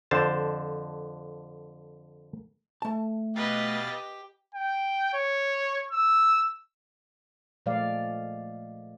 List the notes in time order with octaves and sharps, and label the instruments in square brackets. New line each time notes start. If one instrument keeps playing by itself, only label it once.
[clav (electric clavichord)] F2 D3 C5 A5
[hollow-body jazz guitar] A3 A5
[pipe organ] B2 F5 A6 [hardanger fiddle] G4 [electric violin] B4 D#5
[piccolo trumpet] G5
C#5
E6
[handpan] A#2 F3 G#3 A3 D5 F5